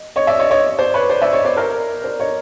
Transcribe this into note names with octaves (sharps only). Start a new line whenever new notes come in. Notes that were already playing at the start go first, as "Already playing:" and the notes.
Already playing: D#5
C#5 D#5
D5 E5
C#5 D#5
C#5 D#5
C5 D5
B4 C#5
C5 D5
D5 E5
C#5 D#5
C5 D5
A#4 C5
C5 D5
C#5 D#5